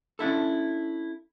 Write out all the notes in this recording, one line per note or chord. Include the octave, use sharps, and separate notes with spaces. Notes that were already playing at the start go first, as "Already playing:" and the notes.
C#4 D4 E4 A4